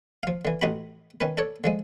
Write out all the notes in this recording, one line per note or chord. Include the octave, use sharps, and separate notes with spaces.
F3 F5
D3 E3
A1 D#4 F#4 B5
D#3 C#4 B4
D4 A4 C#5
D3 F3 G#3